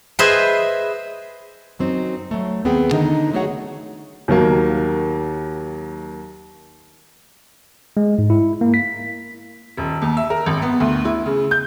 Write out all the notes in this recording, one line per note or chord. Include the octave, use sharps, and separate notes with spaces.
G#4 B4 C5 D#5 E5 G#5
F#2 F#3 C4 D#4
F#3 A3
D#2 B3 C4 G#4 G5
D3 D#3 D#4 D#5
F#3 A3 F#4 G#4 C#5 F#5
D#2 D#3 F#3 A#3
G#3
G#2
E4
A#3
B6
D#1
D#2
E5
A#4
G#1
B3
D2
E4
C#3
G6